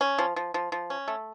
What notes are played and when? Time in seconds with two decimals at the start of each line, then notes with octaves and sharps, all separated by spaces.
0.01 C#4
0.18 F3
0.36 F3
0.54 F3
0.72 F3
0.90 C#4
1.08 A3